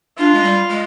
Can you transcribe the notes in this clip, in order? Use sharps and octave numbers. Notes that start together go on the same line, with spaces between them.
D4 F4
G#3
G3
G#3